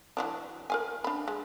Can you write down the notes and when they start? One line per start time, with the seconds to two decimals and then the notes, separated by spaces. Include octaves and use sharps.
0.17 E3 F#3 D4
0.70 A#4 F5 G#5
1.04 D4 B5
1.28 G#3